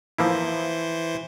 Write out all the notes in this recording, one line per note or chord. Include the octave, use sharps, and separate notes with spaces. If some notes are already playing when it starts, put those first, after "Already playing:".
E3 F3 A#3 E4 C5